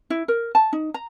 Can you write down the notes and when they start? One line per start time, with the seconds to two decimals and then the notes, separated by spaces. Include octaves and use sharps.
0.10 E4
0.28 A#4
0.55 A5
0.73 D#4
0.94 A#5